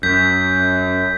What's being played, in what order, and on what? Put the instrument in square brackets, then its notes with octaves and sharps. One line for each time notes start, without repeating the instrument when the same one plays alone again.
[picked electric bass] F#2 [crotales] G6 B6